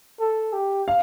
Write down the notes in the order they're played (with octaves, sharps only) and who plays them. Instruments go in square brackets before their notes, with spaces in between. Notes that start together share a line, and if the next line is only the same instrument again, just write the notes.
[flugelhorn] A4
G4
[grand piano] F5